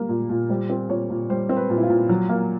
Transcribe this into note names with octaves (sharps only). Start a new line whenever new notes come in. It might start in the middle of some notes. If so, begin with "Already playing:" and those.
Already playing: G3 A#3 A#4
A#2
A#2
G3 C5
C4
A#2 C#5
A#2
G3 C5
C4
B4
A#2
E4
F4
A#2
F#3
A#3